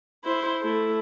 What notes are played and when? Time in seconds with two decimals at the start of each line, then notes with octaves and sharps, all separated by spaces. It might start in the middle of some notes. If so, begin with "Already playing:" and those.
0.24 E4 C5
0.62 A3 E4